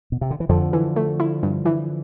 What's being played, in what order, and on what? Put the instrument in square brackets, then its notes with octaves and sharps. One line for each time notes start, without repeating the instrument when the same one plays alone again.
[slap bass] B2
C3
D3
E3
[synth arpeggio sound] F2 [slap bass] D3 F3
[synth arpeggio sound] E3
A3
E4
G2
E3